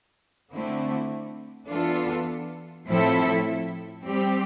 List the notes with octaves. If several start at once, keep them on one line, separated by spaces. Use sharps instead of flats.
D3 A3 C4 E4
E3 B3 D4 F4 A4
A2 F3 C4 E4 A4
G3 C4 G4